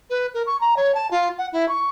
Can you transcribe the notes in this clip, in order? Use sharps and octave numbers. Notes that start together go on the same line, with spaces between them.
B4
A#4
C#6
A#5
C#5
A5
F4
F#5
E4
C#6